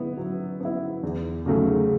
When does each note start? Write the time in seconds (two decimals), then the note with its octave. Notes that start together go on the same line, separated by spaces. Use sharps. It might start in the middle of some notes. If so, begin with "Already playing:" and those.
Already playing: B3 E4
0.17 F#3
0.60 B3 E4
1.03 E2
1.46 C#3 F#3 A3